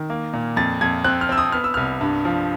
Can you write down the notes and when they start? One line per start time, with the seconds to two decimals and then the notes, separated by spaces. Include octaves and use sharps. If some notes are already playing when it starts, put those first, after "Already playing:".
Already playing: D#3
0.10 A#3
0.33 A#2
0.56 F2 A6
0.81 F2 G#6
1.04 C4 F#6
1.21 F6
1.29 C4 E6
1.38 D#6
1.52 B3 F6
1.64 E6
1.74 C2 F6
2.01 G2
2.25 F3